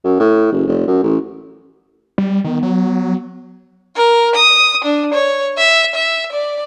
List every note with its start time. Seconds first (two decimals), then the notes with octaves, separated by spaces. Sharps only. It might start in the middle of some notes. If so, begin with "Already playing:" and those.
0.04 F#2
0.20 A2
0.52 F#1
0.67 F1
0.87 F#2
1.03 A1
2.18 G3
2.44 D#3 B3
2.63 F#3
3.96 A#4
4.36 D#6
4.84 D4
5.14 C#5
5.58 E5
5.95 E5
6.32 D5